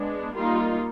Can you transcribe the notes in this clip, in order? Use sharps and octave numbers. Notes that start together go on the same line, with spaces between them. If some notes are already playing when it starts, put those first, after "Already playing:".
Already playing: G#3 B3 D4
G3 A#3 D#4 F4